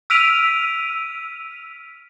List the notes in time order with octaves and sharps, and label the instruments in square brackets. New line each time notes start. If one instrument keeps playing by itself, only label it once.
[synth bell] E6 F6 B6 D7 D#7 F7